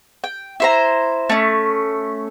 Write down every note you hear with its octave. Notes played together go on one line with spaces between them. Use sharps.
G5
E4 C5 A#5
A3 C#4